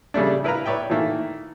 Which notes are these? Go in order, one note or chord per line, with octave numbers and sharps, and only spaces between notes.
C#3 G3 A3 D4
E4 A#4 B4 E5 F5 A#5
B4 C#5 D5 E5 G5
D#3 E3 A3 A#3